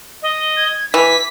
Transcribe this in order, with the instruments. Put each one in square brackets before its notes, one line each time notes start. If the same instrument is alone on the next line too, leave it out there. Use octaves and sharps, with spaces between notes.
[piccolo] D#5
[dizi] G#6
[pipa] E3 [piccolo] G#5 [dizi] D6 [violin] B6